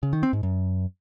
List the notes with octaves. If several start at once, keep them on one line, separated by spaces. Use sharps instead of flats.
C#3
D#3
C4
G#2
F#2